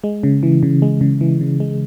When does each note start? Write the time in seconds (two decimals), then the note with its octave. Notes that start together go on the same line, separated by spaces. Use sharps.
0.04 G#3
0.23 C#3
0.43 E3
0.63 C#3
0.82 G#3
1.01 C#3
1.21 E3
1.41 C#3
1.60 G#3